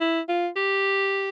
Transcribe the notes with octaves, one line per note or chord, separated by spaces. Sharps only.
E4
F4
G4